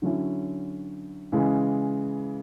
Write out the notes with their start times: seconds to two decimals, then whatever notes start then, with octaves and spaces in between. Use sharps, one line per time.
0.02 D3 F#3 C#4 E4
1.32 C#3 E3 G#3